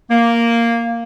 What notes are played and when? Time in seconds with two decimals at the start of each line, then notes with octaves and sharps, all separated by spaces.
0.11 A#3